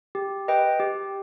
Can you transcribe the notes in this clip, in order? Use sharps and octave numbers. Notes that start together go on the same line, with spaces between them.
G4
B4 D#5 G5
G4